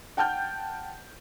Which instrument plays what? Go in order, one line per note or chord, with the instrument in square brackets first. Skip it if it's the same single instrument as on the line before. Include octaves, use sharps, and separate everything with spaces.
[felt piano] F#5 G5 A5 F6 G6